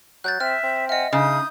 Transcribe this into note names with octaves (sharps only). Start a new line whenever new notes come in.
F#3 F#6 G6 A6
C4 E5 F6
C4
D#5 E5 F#5 G#5 F6
C#3 D#4 D#6 G6